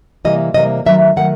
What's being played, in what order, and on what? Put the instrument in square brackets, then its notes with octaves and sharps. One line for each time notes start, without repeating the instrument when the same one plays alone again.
[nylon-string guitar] C3 E3 G3 A#3 D#5
C3 E3 G3 A#3 D#5
D#3 F#3 A3 E5
D#3 F#3 A3 F#5